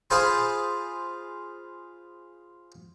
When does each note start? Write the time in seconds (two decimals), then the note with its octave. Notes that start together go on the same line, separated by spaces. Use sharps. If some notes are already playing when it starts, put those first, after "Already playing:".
0.10 F4 G#4 C5 A5 B5